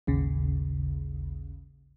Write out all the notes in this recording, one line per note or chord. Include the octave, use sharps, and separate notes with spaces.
A1 D#2 C#3